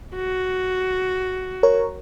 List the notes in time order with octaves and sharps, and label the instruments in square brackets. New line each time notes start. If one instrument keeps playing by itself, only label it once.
[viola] F#4
[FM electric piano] A#4 C#5